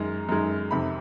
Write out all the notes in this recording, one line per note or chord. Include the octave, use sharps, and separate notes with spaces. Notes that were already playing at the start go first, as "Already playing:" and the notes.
Already playing: F#2 D#3 G#3 A#5
F#2 D#3 G#3
F2 C3 D#3 B5